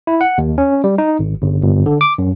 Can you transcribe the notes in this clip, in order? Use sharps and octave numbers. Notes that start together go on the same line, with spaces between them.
E4
F#5
D#2
C#4
G3
D#4
G#1
G1
G1
D3
D6
F#2